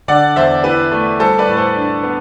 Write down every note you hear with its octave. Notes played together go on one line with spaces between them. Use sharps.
D3 D5 F#5
E2 C5 E5
E4 G4 B4
A3
G3 A4 C5
B4 D5
A2
A4 C5
D4
B3